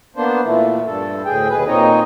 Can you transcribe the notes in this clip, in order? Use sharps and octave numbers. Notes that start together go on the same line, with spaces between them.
A#3 B3 D4 C5
A#2 E3 A3
G2 A4
D2 A2 G#4 G5
D#2 B2 G#4 B4
A#2 C4 D#4 C#5 D#5